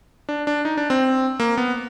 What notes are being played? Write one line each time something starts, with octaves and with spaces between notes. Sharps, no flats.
D4
D4
D#4
D4
C4
A#3
B3